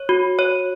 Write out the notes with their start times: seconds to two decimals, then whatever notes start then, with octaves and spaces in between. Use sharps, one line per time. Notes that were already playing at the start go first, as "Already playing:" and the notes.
Already playing: C#5
0.09 F#4
0.39 C#5